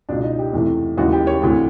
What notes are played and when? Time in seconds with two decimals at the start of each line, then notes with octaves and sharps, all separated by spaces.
0.09 C#2 B2 G#3 D4
0.23 D#4
0.39 G4
0.53 E2 C3 E3 A3
0.98 D#2 C#3 E3 G#3 F#4
1.13 G4
1.27 C#5
1.42 D2 C3 E3